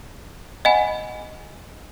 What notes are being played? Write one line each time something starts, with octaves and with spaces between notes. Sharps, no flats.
D#5 F#5 G#5 B5